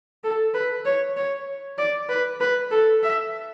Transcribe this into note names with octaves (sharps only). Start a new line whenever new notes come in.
A4
B4
C#5
C#5
D5
B4
B4
A4
E5